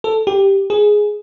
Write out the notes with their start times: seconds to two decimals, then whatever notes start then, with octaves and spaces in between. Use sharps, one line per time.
0.04 A4
0.27 G4
0.70 G#4